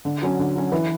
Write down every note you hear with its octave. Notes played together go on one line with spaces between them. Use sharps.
D3
F#3 C#4
D3
F#3 C#4
E3 B4